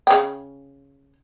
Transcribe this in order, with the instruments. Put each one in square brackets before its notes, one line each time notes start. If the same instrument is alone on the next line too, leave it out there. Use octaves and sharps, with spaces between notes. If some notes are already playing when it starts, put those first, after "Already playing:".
[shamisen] C#3 G5